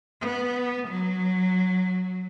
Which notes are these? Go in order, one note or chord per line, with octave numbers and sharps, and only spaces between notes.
B3
F#3